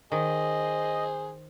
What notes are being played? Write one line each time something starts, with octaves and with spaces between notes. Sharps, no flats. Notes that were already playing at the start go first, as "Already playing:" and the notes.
D#3 G#4 C5 D#5